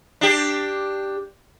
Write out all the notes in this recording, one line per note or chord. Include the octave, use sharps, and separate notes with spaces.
D4 G4